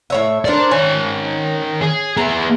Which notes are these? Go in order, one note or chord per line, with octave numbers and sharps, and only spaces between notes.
A2 C#5 E5
D4 A4 A#4 C5 D5
D#3 C#4 G#5
G#4
B3 G#4 A#5